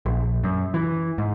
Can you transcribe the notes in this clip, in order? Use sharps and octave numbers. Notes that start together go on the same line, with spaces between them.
A#1
F#2
E3
G#2